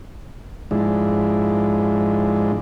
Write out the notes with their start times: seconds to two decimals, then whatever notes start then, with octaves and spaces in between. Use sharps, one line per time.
0.71 G#2 F3 G#3 D4 E4